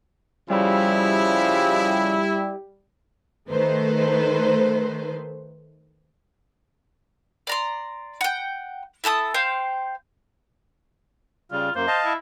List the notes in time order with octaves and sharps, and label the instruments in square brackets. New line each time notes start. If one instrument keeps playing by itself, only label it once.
[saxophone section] C#3 F3 [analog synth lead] G3 [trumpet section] E4
[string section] D#3 A3 B4 C5
[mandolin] D5 A#5 C6
F#5 G5
E4 A4 A5 D#6
C5 F5 G5
[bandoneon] C#3 G3 [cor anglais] F4
[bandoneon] F#2 A#3 [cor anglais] C5
[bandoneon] D#5 F5 A5
[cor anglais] E4